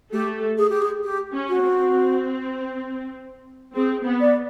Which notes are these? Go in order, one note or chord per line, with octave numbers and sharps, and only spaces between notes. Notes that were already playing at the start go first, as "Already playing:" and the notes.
A3 G4 A4
G#4
G4
G#4
G4
C#4
F#4
C4
C4 G#4
B3
D5